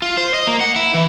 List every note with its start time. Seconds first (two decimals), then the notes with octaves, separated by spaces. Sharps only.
0.02 F4
0.17 C5
0.34 D#5
0.47 A#3
0.61 F#5
0.76 E4
0.94 E3